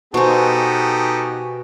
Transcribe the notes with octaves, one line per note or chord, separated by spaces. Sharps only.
B2 B3 D#4 G4 A4 C5 G#5 C#6